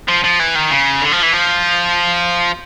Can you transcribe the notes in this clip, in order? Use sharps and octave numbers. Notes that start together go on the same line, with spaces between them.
F3
F3
E3
D#3
C#3
D3
F3
E3
F3